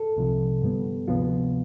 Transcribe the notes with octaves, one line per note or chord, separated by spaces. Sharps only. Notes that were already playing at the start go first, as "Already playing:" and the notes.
Already playing: A4
C2 C3 F3
G2 D3 G3 B3
D2 C3 F3 B3 F4